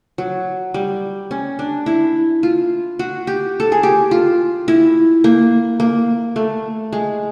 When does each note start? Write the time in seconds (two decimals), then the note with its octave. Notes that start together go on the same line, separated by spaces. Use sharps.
0.18 F#3
0.74 G3
1.31 C#4
1.59 D4
1.86 E4
2.43 F4
2.99 F#4
3.27 G4
3.60 A4
3.72 G#4
3.83 G4
4.11 F4
4.68 E4
5.24 A#3
5.80 A#3
6.36 A3
6.93 G#3